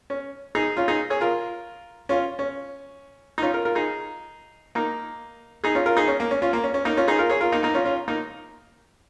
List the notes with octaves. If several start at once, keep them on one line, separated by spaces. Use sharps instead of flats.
C#4
D#4 G#4
C#4 F4
D#4 G#4
G#4 C#5
F4 A#4
C#4 F4
C#4
D#4
C#4 F4
F4 A#4
F4 A#4
D#4 G#4
A#3 D#4
D#4 G#4
C#4 F4
F4 A#4
D#4 G#4
C#4
A#3
C#4
C#4 F4
A#3
C#4
C#4
A#3 D#4
C#4 F4
D#4 G#4
F4 A#4
G#4 C#5
F4 A#4
A#3 D#4
A#3 D#4
C#4 F4
C#4 F4
A#3 D#4